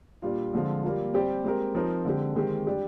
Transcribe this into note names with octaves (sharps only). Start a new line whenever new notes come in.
A#2 G3 D4 F4
D3 F3 G#3 C4 F4
G3 A#3 F4
G3 C4 G4 D5
G#3 C4 G4 A#4
F3 C4 D#4 A#4
D3 G#3 C4 G4
D#3 G#3 C4 G4
G3 D4 G4